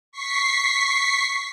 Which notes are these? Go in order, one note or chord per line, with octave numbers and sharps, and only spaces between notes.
C#6 B6 C7